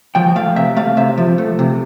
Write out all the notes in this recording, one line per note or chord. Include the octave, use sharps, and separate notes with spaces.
F3 G5
A3 F5
C3 E5
A3 F5
C3 E5
F3
A3
C3